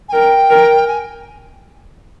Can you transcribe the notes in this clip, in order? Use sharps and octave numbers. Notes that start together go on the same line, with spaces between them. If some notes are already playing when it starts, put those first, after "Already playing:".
G#5
A#4 G5
A#4
G#5